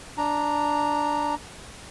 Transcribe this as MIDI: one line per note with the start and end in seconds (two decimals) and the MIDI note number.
0.18 1.35 62
0.18 1.35 82